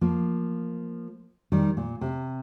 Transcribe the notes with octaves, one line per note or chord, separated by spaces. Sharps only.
F3 A#3
D#3 G3
A#2
C3